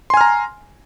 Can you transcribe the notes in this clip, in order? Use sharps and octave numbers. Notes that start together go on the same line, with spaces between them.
G#5 A#5 C6 F6